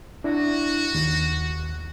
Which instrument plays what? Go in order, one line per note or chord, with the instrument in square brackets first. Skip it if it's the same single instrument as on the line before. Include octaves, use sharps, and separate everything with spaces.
[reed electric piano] D4 E4 [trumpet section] F#4
[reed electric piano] D#2